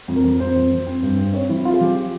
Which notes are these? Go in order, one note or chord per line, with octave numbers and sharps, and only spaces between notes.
F2
A#4
F2
F2 C5
F2
F2
C4
G2
C4
C4 C#5
F3 E4
C4 F4
G#4
F3 G4